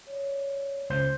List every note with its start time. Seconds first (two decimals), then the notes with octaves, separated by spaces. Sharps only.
0.07 C#5 D5
0.90 C#2 C5 G6